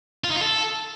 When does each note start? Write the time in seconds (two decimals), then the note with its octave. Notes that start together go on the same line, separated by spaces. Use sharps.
0.24 F4
0.30 D#4
0.36 F4
0.42 A4